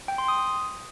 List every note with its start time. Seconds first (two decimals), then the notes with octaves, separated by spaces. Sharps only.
0.08 G5
0.18 C6
0.28 D#6